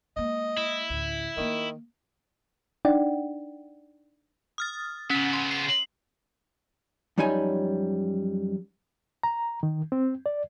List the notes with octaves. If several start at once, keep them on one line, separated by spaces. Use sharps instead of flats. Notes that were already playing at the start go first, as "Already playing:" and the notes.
G#3 A#3 D#5
E4
A1 D2
D#3 A3 A#3
D4 D#4 D5 F#5 G5
D#6 F6 A6
C#3 B3 C#4
C6
C7
F#2 F3 G3 D#4 C#5 G#5
A#5
D#3
C4
D5